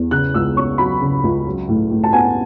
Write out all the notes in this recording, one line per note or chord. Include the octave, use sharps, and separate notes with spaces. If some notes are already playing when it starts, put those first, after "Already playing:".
Already playing: E2
C#3 F#6
C#2 E6
C#4 C#6
F#3 B5
C#3
C#2
F#3
A2
A2
A5
B3 G#5